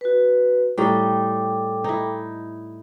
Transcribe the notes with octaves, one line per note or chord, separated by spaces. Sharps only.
F#4 B4
A2 G3 D#4 A4 G5 D6
D#4 E4